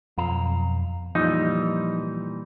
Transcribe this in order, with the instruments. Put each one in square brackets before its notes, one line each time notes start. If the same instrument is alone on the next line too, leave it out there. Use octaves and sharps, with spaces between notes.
[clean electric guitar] B1 F5 A#5 [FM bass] F2
[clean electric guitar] A#2 E3 G3 [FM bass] F3 [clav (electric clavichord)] D#4